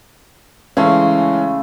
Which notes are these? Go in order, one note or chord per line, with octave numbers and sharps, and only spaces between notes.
C#3 E3 G#3 A3 C#4 C6